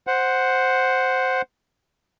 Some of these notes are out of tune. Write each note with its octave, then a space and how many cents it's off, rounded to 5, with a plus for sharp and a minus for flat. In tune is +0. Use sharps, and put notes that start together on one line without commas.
C5 +0 F#5 +0